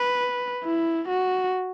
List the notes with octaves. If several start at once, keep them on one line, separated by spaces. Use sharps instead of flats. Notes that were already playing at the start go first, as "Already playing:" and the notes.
Already playing: B4
E4
F#4